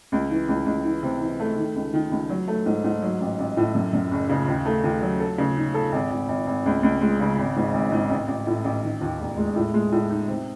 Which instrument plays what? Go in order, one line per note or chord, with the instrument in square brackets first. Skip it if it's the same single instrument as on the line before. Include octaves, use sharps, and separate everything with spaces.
[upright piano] C#2
E3
C#2
C#2
E3
C3
E3
A3
D#3
C#2
D#3
C#2
F#3
A3
G#2
G#2
F#3
A1
A1
A2
F#2
F#2
F#1
C#3
D#2
A3
D#2
F#3
A4
C#3
D#4
A4
G#1
G#1
G#1
G#1
C#2
C#2
G#3
C#3
G#1
G#2
G#1
G#2
A1
A1
A2
A1
D#3
D#2
E1
G#3
A2
G#3
A2
D#4
C3